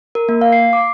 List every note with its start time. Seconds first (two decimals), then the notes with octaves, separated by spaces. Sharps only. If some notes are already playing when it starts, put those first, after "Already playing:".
0.15 A#4
0.29 A#3
0.41 F5
0.53 C7
0.73 D6